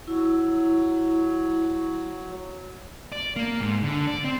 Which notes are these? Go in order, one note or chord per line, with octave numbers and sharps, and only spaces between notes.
F#3 E4
D5
A#3
G#2
D3
D5
C4